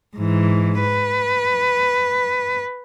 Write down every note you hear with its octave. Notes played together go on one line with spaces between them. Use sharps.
G#2 E3
B4